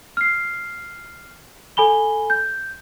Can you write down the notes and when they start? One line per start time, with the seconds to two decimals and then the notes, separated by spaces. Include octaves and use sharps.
0.17 F6 C7
1.77 A4 G#5 B5 G7
2.30 G6